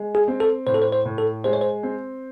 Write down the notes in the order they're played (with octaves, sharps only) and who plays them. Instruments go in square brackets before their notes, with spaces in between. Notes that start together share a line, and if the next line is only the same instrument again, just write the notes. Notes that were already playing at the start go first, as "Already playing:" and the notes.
Already playing: [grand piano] G#3
[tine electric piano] G#4
[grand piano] C4
[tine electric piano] A4
[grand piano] A2 [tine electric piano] C5
[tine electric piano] A4
C5
C5
[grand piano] A2
[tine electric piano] A4
[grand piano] G#3 [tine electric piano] C5
[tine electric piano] C#5
C5
[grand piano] C4